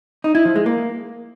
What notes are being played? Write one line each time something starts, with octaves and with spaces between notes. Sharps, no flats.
D#4
E4
F3
G#3
A#3